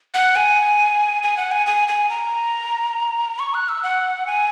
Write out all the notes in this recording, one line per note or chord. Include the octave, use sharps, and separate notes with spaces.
F#5
G#5
G#5
F#5
G#5
G#5
G#5
A#5
C#6
F#6
E6
F#5
G#5